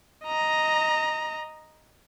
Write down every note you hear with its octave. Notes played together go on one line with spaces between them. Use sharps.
D#5 A#5